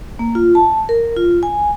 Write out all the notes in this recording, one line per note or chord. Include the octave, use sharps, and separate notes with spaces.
A#3
F4
A5
A#4
F4
G#5